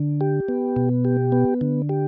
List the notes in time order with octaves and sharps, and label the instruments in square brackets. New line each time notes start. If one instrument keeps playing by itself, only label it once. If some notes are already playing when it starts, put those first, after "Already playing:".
Already playing: [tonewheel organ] D3
G4
B3
B2
G4
B3
D3
G4